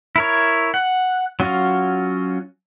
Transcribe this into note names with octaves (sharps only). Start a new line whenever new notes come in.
E4 A#4 C#5
F#5
F#3 C#4 F4 F#4